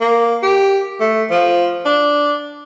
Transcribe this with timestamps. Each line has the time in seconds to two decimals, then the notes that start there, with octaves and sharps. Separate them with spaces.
0.01 A#3
0.43 G4
1.00 A3
1.31 F3
1.85 D4